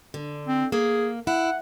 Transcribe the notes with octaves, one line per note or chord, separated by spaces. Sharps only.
D3
C4
A#3 G#4
E4 F#5